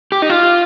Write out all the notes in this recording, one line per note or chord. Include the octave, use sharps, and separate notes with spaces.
G4
D#4
F4